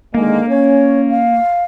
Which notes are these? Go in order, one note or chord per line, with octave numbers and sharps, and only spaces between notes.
D3 D#3 G#3 A#3 A#4
C#4 C#5
F5